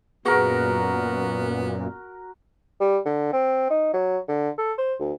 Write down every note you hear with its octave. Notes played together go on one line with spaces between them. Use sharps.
F#2 A#2 B3 F#4 G#4 A#4 B4
G3
D3
C4
D#4
F#3
D3
A4
C5
D2